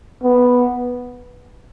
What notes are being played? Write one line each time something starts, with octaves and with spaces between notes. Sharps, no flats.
B3